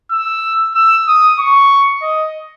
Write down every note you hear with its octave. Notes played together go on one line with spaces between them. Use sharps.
E6
E6
D#6
C#6
D#5